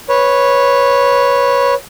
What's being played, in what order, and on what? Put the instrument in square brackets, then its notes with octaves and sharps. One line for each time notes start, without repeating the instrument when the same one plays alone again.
[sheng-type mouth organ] B4 C#5